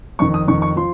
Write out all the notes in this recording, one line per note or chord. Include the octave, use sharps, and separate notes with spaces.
F2 D#3 C#6
D#6
F2 D#3 C#6
C#6
F3 C6